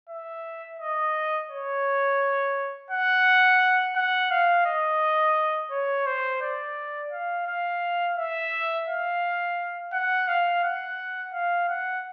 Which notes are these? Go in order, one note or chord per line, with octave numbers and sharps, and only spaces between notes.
E5
D#5
C#5
F#5
F#5
F5
D#5
C#5
C5
D5
F5
F5
E5
F5
F#5
F5
F#5
F5
F#5